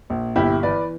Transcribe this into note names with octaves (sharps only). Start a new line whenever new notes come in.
A#1
G1 E4 G4
E3 B4 D5